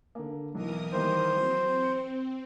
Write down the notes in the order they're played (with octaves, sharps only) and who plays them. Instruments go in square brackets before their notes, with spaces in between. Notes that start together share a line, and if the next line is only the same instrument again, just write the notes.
[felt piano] D3 A#3
[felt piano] B1 [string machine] E3 A#4 D#6
[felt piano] D#3 G3 A#3 [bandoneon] C5
[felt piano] F#3 [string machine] C4
[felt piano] C#7